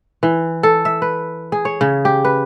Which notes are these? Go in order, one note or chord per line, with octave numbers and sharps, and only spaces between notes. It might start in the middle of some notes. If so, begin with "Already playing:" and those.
E3
A4
E5
B4
G#4
C#5
C#3
G4
B4